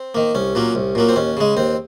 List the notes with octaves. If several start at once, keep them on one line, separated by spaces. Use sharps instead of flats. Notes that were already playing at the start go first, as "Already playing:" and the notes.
Already playing: C4
D#3 A#3
C2 C#4
A#2 F#3 A#3
C2
A#2 F#3 A#3
C4
D#2 C#4
C#3 G#3
D#2 C4